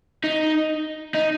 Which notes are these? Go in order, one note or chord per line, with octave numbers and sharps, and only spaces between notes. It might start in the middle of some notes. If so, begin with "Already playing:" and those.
D#4
D#4